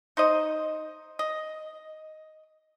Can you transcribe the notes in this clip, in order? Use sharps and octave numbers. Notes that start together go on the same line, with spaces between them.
D#4 C5 D#5
D#5